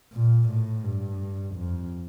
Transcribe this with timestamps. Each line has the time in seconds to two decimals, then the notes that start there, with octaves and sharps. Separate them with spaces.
0.13 A#2
0.49 A2
0.84 G2
1.55 F2